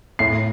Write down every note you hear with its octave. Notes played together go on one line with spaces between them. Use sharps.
A2 C7